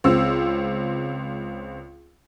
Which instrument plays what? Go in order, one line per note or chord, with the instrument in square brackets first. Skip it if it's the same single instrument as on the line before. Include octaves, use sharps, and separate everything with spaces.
[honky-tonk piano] C#2 C4 E6